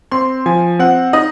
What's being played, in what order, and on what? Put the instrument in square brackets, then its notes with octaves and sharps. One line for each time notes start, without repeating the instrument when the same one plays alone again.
[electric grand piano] C4 [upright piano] C6
[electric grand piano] F3 [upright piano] G#5
[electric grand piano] C4 [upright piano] F#5
[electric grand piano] D#4 [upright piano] D#5